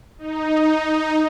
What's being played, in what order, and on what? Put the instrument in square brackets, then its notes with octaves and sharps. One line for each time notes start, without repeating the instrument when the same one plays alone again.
[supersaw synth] D#4